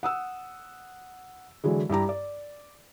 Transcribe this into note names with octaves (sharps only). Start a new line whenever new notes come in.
F#5 D#6 E6
D3 E3 F#3 G#3
G2 E4 G4 A#5
D5